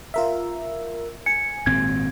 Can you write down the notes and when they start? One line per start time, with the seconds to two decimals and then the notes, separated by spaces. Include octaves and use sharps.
0.14 F4 A#4 E5
1.26 G#5 C#7
1.66 G#1 A#2 C4 G#6